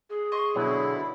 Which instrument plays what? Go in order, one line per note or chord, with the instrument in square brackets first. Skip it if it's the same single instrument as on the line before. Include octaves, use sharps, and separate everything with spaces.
[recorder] G#4
[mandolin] D#5 C6 C#6
[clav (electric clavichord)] B2 F#3 [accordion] D3 E4